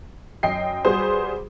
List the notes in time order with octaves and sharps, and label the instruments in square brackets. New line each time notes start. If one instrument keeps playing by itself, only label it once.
[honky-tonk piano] F#2 D#5 G5 C7
G3 F#4 G#4 B4 C5